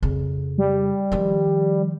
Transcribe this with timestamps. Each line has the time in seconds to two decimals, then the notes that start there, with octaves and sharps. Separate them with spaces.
0.02 F2 C#3
0.58 G3
1.12 D#3 F3